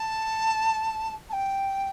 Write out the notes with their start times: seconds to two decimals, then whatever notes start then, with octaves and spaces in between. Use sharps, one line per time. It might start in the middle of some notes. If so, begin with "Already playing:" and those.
Already playing: A5
1.29 A5
1.33 G5